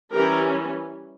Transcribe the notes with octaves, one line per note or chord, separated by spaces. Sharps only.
E3 G3 C#4 G4 A#4